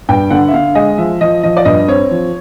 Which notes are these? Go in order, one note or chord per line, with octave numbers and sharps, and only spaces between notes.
G2 G5
D3 F#5
E5
D3 F5
G#3 D#5
F3 E5
F3 D#5
F3 D#5
D5
G2 D#5
C4 C#5
F3